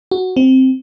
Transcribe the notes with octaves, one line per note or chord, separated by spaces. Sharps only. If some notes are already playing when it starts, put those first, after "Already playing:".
F#4
C4